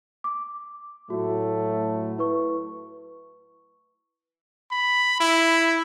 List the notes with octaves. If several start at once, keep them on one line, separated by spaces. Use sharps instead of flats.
D6
A2 F#3 A3 F#4
E4 B4 C#6
B5
E4